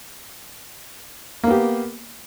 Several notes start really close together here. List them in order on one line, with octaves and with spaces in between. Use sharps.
A#3 B3 G4